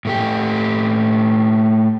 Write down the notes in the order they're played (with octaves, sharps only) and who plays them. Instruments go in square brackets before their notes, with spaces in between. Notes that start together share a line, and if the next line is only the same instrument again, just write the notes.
[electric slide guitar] A2 A3 G4